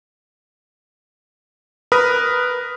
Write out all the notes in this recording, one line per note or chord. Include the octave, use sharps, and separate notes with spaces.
A#4 B4 B5 D#6